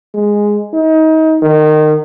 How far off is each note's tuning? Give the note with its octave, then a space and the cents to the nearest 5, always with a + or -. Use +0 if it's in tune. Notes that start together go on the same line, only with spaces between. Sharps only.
G#3 -5
D#4 +30
D#3 -25